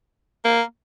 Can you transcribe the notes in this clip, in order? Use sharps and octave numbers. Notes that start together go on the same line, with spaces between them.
A#3